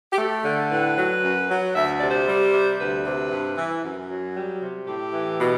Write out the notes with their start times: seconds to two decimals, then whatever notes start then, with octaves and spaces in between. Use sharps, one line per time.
0.13 G4
0.18 A3 A4
0.44 D3
0.70 A2 B4
0.97 F#3
1.23 F#2
1.49 F#3
1.75 D2 E5
1.98 C3 D5
2.10 C5
2.27 G3
2.53 C3
2.79 D2 B4
3.05 C3
3.31 G2
3.57 E3
3.83 F#2
4.09 F#3
4.35 G3
4.61 C3
4.87 A2 G4
5.13 E3
5.40 B2